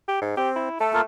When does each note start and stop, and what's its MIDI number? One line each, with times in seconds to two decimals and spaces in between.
0.08 0.21 67
0.21 0.33 44
0.37 0.69 60
0.37 0.50 67
0.56 0.78 64
0.80 1.02 57
0.80 0.92 69
0.93 1.01 58
0.93 1.01 65
0.93 1.01 69